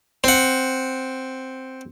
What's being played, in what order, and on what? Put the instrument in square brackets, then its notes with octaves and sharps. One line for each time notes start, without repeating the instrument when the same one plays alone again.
[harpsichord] C4 F#5